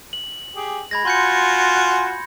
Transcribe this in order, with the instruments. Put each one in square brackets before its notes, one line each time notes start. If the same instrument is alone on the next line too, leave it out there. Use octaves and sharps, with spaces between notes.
[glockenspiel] F#7
[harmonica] G4 G#4
[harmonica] G#3 [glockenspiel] B5 G#6 A#6
[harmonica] F4 F#4 G#5 [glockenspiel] C6 G6 C#7